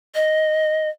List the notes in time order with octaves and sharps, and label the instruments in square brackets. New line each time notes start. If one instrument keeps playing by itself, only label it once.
[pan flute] D#5